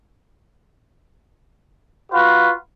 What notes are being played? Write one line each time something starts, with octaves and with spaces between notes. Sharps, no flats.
F4 F#4 B4